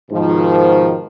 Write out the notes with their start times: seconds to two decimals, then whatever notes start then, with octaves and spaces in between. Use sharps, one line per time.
0.11 G#2 B2 D#3 F3